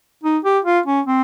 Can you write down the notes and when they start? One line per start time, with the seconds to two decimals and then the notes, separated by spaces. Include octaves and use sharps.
0.24 D#4
0.45 G4
0.65 F4
0.86 C#4
1.07 C4